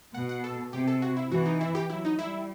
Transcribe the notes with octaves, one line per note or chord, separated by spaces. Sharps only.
B2 F#5
F#5
A4
C3 G4
A4
F#4
E4
E3 F#4
D#4
E4
G4
F#3 E4
D#4
G3 E4